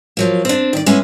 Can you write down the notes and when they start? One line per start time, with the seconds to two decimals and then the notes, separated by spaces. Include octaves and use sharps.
0.17 F3 F#3 A#3
0.45 C4 D4
0.73 D#3 D5
0.86 G#3 B3 C#4 E4 G#4